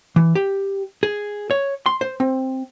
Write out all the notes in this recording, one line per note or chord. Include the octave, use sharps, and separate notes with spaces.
E3
G4
G#4
C#5
C6
C5
C4